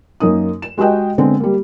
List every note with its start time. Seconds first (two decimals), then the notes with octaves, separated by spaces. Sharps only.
0.20 F#2 A#3 D#4 D#6
0.62 E7
0.78 G#3 F#4 G4 D#5 G5
1.18 D3 G#3 B3 C4
1.40 G3 A#3